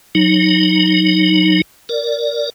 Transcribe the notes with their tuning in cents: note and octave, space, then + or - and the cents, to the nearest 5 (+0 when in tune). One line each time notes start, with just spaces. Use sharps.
F#3 -15 D#4 +0
A#4 +0 D5 -10